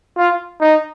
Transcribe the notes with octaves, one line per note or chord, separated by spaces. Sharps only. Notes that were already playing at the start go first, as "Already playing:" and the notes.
F4
D#4